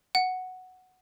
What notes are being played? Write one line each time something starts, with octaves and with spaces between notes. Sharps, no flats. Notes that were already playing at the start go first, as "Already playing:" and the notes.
F#5